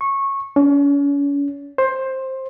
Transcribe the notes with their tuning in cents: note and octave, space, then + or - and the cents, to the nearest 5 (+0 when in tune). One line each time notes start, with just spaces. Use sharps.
C#6 -15
C#4 +35
C5 +15